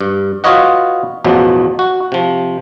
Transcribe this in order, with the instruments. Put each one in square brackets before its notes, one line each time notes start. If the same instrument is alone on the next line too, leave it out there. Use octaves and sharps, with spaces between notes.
[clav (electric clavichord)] G2
F4 F#4 B4 C#5 D#5 F#5
A1 E2 B2 F3 F#3
F#4
C3 F3